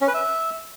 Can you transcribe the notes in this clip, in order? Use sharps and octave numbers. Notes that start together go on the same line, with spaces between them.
C#4
B4
E5